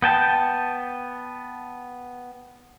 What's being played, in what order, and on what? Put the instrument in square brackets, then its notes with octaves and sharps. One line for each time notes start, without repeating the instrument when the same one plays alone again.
[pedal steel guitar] B3 G5 A5